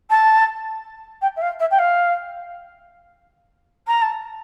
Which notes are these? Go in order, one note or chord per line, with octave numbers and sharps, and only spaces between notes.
A5
G5
E5
F5
E5
G5
F5
A#5
A5